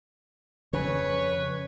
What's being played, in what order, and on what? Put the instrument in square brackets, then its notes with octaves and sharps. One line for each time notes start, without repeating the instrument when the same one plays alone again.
[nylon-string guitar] F2 [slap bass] C#3 [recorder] B4 [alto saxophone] C#5